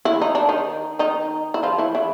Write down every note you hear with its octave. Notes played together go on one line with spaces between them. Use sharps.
E3 E4
D#4
D4
D#3 D#4
D#3 D#4
E4
F3 F4
E3 E4
E3 E4